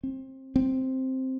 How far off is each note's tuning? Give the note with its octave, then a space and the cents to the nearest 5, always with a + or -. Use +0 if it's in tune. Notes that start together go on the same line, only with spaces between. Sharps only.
C4 +25
C4 +0